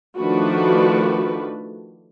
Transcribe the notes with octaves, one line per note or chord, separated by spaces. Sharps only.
D#3 F3 A3 D4 F#4 B4